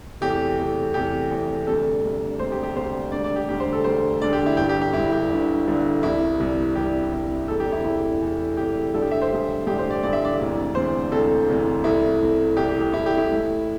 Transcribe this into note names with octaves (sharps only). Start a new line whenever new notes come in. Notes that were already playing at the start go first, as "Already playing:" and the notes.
E2 C3 A3 G4
E2 C3 A3
E2 C3 A3 G4
E2 C3 A3
E1 D2 C3 G3 A4
E1 D2 C3 G3
E1 D2 C3 G3 C5
G4
G4
E1 D2 C3 G3 C5
E1 D2 D3 G3 D5
D5
G4
E1 D2 D3 G3 G4
C5
A4
E1 D2 D3 G3 C5
E1 D2 D3 G3 D5
G4
E4
G1 G2 D3 G4
G4
G4
G1 G2 D3 E4
G4
G1 G2 D3
G1 G2 D3
C2 C3 G3 E4
C2 C3 G3
C2 C3 G3 G4
C2 C3 G3
E1 E2 C3 A3 A4
G4
E4
E1 E2 C3 A3 E4
E1 E2 C3 A3
E1 E2 C3 A3 G4
A1 G2 D3 G3 A4
G4
E5
C5
A1 G2 D3 G3
A1 G2 D3 G3 G4
C5
D5
A1 G2 D3 G3 D5
E5
D5
E1 D2 C3 E3
E1 D2 C3 E3 C5
E1 D2 C3 E3 A4
E1 D2 C3 E3
C2 C3 A3 E4
C2 C3 A3
C2 C3 A3 G4
G4
G4
C2 C3 A3 E4
G4
E4
A1 A2 A3